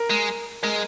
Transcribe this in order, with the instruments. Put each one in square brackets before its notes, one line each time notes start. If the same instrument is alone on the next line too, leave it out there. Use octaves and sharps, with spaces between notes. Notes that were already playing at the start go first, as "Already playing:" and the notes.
Already playing: [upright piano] A#4
[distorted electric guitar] G#3
[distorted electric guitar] G#3 [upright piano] A#4